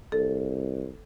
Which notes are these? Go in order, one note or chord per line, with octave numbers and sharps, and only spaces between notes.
C2 A4